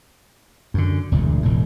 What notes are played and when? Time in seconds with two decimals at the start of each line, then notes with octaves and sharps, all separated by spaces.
0.74 F#2 D3
1.12 E1 D2 A#2
1.42 E1 A2